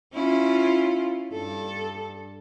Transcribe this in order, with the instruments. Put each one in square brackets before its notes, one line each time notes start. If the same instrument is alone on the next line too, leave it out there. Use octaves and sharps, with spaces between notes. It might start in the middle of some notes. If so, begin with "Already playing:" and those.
[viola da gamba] C#4 E4 F4
G2 A4